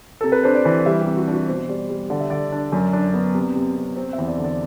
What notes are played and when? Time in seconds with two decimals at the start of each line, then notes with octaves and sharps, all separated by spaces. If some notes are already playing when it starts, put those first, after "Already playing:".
0.21 C3 A4
0.32 B4
0.44 D4 C5
0.55 D5
0.65 E3
0.86 G3 E5
1.01 G4
1.06 C3
1.16 F#4
1.28 D4 F#4
1.48 B2 C5
1.69 G3 D5
1.90 G3
2.10 D3 D5
2.20 E5
2.30 D3 D5
2.52 D4
2.72 F#2
2.93 D4
3.14 B3
3.34 C3
3.55 C3
3.76 C3
3.96 C4 C5
4.13 E5
4.18 E2
4.28 D5
4.38 D3
4.44 D5